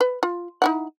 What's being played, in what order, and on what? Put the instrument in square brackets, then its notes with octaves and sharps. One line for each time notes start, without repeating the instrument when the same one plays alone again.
[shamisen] B4
F4
D#4 E4 F#5